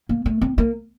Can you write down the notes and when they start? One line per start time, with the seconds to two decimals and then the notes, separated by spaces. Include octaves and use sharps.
0.09 A#3
0.26 A3
0.41 C4
0.58 A#3